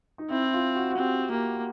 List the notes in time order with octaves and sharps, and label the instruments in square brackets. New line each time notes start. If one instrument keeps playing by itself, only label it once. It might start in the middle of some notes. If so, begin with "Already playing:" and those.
[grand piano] D#4
[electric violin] C4 [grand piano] E4
[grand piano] E4
F4
F#4
F#4
[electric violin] C4 [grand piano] G4
[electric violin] A#3 [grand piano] G4